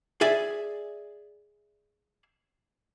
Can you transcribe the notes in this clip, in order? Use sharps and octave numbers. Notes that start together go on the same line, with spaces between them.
G#4 D5 E5 G#5